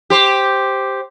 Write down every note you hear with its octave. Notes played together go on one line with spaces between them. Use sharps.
G4 C5